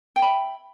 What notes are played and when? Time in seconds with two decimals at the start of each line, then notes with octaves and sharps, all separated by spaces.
0.16 G5
0.19 G#5
0.22 B5
0.25 E5